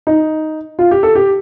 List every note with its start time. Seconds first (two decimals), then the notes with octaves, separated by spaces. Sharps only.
0.07 D#4
0.79 F4
0.91 G4
1.03 A4
1.15 G4